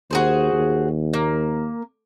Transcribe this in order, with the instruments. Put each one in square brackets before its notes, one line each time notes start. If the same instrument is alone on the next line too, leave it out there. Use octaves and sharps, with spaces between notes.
[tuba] D#2 [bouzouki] F#4 G#4 C5
[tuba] D#2
[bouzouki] A#3